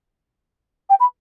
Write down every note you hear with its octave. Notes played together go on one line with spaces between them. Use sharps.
G5
B5